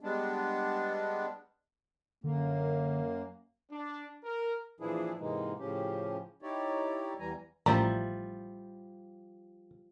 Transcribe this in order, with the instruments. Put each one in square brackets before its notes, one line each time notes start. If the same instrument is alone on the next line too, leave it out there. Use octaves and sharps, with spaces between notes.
[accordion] G3 G#3 B3 D4
[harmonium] F#2 A#3 [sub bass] D3
[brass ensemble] D4
A#4
[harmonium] A#2 E3 F3 D4 E4 G#4
G#2 C3 E3 G#3 A#3 D#4
A2 C#3 F3 C#4 G4
D#4 E4 G4 C#5 D5
E2 E3 G3 G#5 A#5
[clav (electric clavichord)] A1 A#3 [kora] F3 G3 E5 [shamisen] E4 D5 A#5